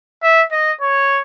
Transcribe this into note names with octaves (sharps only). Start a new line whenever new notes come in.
E5
D#5
C#5